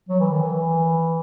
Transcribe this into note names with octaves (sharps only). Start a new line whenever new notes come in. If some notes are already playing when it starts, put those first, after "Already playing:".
F#3
E3
D#3
E3